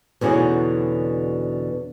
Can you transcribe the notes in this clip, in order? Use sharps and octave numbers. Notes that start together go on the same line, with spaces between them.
E2 B2 D3 C#4 D#4 F#4